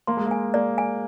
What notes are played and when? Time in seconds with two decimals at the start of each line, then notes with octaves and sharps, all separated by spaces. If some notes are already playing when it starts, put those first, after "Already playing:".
0.07 A#3 C6
0.17 G#3
0.26 A#3
0.31 G#5
0.54 A#3 D5
0.78 G#5